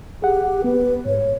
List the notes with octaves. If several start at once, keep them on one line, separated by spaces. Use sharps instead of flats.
G4 G#4 F#5
B3 B4
G#2 C#5